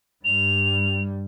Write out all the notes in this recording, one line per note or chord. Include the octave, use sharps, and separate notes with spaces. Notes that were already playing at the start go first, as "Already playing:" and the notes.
G2 G3 F7